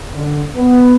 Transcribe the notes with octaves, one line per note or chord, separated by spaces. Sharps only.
D3
B3